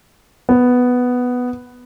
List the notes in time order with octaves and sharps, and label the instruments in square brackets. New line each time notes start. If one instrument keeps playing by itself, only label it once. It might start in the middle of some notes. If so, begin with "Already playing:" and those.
[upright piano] B3